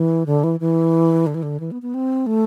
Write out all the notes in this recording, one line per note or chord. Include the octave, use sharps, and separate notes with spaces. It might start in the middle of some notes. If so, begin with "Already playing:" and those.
Already playing: E3
D3
E3
E3
D3
E3
D3
E3
B3
B3
C4
A3